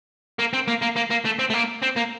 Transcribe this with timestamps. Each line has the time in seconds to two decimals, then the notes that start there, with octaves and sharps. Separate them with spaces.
0.39 A#3
0.53 C4
0.68 A#3
0.82 A#3
0.97 A#3
1.11 A#3
1.25 A3
1.39 C4
1.50 A3
1.54 A#3
1.83 C4
1.97 A#3